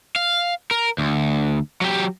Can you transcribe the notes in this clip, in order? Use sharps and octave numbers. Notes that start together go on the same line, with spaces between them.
F5
A#4
D2
F#3 G4